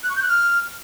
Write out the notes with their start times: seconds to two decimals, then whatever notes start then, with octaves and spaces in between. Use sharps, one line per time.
0.03 F#6
0.10 C#6
0.16 G6
0.22 F#6
0.29 F6